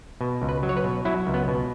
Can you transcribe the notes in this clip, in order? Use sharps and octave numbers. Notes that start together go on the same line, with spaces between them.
B2
C#2
B4
F#3
C#5
B4
B2
F#3 E4
C#2
B3
B2